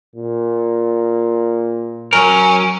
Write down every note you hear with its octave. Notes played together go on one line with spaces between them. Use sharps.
A#2
F#3 C#4 A#4